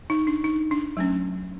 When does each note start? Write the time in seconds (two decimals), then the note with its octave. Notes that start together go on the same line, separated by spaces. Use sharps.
0.10 D#4
0.27 D4
0.44 D#4
0.71 D4
0.97 F#3 A3 C#4